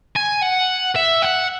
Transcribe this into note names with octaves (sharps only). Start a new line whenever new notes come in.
G#5
F#5
E5
F#5